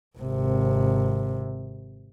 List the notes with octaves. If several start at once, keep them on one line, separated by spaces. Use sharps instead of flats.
G#1 C3